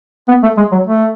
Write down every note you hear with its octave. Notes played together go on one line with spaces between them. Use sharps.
B3
A3
G#3
F#3
A3